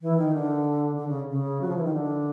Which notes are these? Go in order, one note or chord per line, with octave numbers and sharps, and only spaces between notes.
E3
D#3
D3
D3
C#3
C#3
F#3
F3
E3
D#3
D3